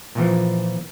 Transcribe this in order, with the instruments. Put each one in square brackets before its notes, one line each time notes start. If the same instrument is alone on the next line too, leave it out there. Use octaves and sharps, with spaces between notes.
[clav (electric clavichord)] A#2 E3 F3